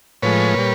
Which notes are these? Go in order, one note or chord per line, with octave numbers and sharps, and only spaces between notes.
A2 F3 G#3 B4 C#5
A#2 G3